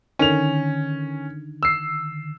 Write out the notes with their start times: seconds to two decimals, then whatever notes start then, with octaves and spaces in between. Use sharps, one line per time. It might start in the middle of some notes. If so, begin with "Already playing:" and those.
0.19 D3 D#3 C#4 F7
1.63 E6 C7